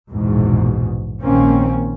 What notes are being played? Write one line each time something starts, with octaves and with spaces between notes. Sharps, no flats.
A#1 E2 G#2 B2
A#1 D#3 A#3 C4 C#4